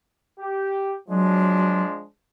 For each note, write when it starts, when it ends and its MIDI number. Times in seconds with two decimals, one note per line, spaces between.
0.40 0.95 67
1.09 2.01 53
1.09 1.83 54
1.09 2.01 56
1.09 2.01 62